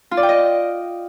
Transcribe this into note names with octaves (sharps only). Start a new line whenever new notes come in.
F4
D5
G5
D#5